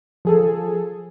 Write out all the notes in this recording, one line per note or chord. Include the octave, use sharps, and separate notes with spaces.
F3 G#4 A4